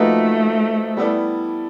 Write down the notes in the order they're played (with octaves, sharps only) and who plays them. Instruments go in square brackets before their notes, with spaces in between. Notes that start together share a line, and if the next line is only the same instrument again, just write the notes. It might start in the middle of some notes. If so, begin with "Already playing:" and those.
Already playing: [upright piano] F3 A#3 D#4 F#4 B4 [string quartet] A3
[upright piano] G3 B3 E4 A4 D5